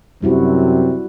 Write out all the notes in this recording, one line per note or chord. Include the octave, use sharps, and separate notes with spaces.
F#2 C3 G3 E4 F#4